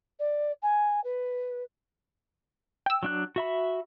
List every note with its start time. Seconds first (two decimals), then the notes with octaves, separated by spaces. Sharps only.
0.19 D5
0.62 G#5
1.04 B4
2.86 G5 E6
3.03 F#3 D4 F#6
3.36 F#4 E5 B5